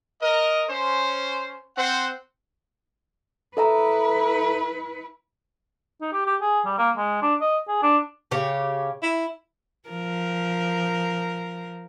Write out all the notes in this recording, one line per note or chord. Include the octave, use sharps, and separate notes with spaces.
A#4 D#5
C#4 C5
C4 C5 F#5
E4 A4 B4 E5 A#5
D#4
G4
G4
G#4
G3
A#3
G#3
D4
D#5
G#4
D4
C#3 G4 C#5
E4
F3 A#4